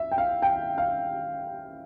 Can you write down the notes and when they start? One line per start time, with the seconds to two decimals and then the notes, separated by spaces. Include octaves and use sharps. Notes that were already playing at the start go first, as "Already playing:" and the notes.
Already playing: E5
0.12 G5
0.18 F5
0.42 G5
0.78 F5